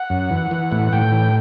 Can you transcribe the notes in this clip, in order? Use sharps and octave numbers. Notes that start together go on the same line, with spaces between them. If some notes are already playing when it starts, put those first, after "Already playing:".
Already playing: F#5
F#2
E3
E3
A2
A2 G5
E3